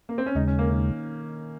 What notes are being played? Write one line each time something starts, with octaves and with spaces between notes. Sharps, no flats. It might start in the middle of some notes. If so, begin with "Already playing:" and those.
A#3
C4
C#4
D#2 C#3 G#3 D#4
C#4
A#3
D#3